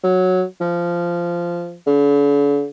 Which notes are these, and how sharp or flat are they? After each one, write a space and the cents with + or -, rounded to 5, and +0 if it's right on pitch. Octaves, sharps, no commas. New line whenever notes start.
F#3 -5
F3 -15
D3 -45